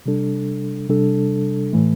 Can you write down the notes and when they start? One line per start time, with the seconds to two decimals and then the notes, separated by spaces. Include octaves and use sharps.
0.06 C3 G3 D4 A4
0.89 C3 G3 D4 A4
1.73 A2 E3 A3